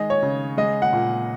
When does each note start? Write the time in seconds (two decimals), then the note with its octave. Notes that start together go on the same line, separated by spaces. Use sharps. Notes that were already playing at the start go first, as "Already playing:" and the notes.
Already playing: D#3 G#3 D#5
0.10 C#5
0.23 C#3
0.57 G#3 D#5
0.82 F#5
0.93 A#2